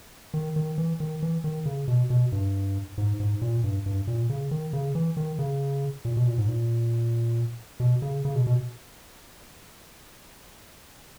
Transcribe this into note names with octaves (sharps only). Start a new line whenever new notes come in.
D#3
D#3
E3
D#3
E3
D#3
C#3
B2
B2
G2
G#2
G#2
A#2
G2
G2
A#2
C#3
D#3
C#3
E3
D#3
C#3
A#2
B2
A#2
G#2
A#2
B2
C#3
C#3
B2
B2